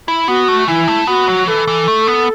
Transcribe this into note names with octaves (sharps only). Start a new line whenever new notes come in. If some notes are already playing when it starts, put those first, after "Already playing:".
E4
B3 F#4
A3
E3 E4
A3
B3 F#4
F#3
E3 A4
E3
A3
B3